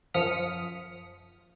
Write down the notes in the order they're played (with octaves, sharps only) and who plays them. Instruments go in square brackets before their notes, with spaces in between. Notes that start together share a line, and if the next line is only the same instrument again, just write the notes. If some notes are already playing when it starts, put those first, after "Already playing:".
[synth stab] F#2 F3 D#6 F6 B6 C#7